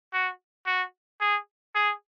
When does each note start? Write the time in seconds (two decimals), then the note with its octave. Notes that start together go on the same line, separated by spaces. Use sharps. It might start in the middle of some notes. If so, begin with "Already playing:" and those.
0.13 F#4
0.67 F#4
1.21 G#4
1.75 G#4